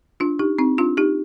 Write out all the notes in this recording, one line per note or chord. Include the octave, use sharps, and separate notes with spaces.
D4 F4
D#4 G4
C4 D#4
D4 F4
D#4 G4